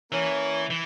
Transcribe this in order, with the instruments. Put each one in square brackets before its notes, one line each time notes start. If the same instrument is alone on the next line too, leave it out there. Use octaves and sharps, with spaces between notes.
[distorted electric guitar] E3 [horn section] A#3 C#4
[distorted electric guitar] E3